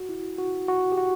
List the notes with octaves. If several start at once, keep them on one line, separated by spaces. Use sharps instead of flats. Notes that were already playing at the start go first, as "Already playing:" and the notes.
Already playing: F#4
E4
F#4
F#4
G4
F#4